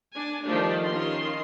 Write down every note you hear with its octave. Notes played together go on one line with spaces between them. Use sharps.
D4 G#5
D#3 F3 G3 A3 D4 G4
D#3 C#4 F4 C6